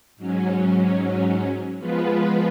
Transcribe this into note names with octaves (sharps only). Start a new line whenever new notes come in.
G#2 F#3 C#4
F3 G#3 B3 F4 B4